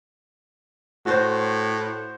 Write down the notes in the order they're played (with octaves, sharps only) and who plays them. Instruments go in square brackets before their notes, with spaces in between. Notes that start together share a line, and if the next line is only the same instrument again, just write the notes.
[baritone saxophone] A2 [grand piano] F#4 C5